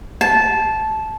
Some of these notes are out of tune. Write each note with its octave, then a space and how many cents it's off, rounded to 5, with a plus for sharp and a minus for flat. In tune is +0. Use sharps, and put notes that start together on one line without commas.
A5 -15